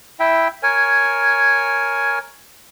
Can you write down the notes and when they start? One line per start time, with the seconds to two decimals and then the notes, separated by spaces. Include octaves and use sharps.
0.20 E4 E5 G5
0.63 A#4 C#5 G#5